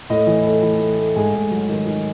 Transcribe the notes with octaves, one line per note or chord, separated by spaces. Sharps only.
A2 D#5
E3
A3
E3
A3
A3
G#2 G#4
G#2
F#3
D#3
D#3